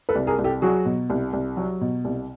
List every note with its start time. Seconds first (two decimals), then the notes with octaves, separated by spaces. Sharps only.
0.09 A4 B4
0.15 C2
0.27 G#4 A#4
0.38 C2
0.44 G4 A4
0.62 F#3 F#4 G#4
0.86 B2
1.10 C2
1.33 C2
1.57 F#3
1.81 B2
2.05 C2